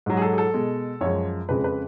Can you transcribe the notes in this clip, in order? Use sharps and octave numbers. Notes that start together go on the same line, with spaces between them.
G#2 F#3
G#4
A4
G#4
A4
B2 G#3
F#2 F3 G#3 C#5
F2 C#3 G#3 B4
B4